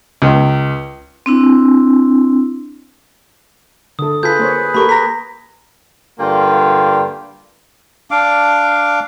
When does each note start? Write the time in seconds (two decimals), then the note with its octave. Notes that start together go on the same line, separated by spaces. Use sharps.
0.22 C#2
1.26 C4 D4 E4
3.99 D3 A4 D#6
4.23 F4 G#4 A4 B4 G6 B6
4.39 A#3 C5 C#5
4.74 A#3 G4 A4 A#4 B5 C#6
4.89 A#5 A#6 B6
6.19 G2 D3 A#3 F4 G5
8.11 D4 F5 D6